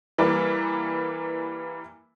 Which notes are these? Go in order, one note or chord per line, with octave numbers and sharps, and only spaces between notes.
E3 G3 A#3 E4